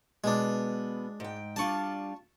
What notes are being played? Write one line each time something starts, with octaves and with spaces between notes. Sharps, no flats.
B2 G#3 B3 D4
G#2 G5
G3 D4 F4 A5 C#6